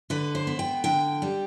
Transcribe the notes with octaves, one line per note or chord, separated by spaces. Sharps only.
D3 B4
C5
B3
G5
D3 G5
G3